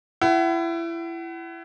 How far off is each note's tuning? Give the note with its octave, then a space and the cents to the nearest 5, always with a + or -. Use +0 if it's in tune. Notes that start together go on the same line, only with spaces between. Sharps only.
E4 +25 F#5 +35